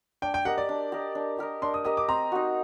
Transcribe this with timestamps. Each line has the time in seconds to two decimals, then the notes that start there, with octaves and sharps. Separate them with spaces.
0.22 D4 G5
0.34 G5
0.45 G4 A#4 D#5 F#5
0.58 D5
0.69 D4
0.92 G4 A#4 D#5
1.15 D4
1.39 G4 A#4 D#5
1.62 D4 C6
1.74 D#6
1.84 G4 A#4 D#5 D#6
1.97 D6
2.08 C4 A#5
2.32 D#4 F#4